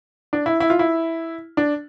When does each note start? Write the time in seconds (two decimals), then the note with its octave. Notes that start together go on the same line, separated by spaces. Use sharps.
0.33 D4
0.46 E4
0.60 E4
0.70 F4
0.79 E4
1.57 D4